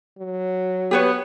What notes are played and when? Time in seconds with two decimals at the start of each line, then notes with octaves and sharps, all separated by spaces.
0.19 F#3
0.91 B3 G4 B4 C#5